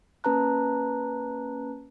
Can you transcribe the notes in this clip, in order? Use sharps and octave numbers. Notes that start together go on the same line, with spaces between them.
A#3 C#4 B4 A5 A#5 F#6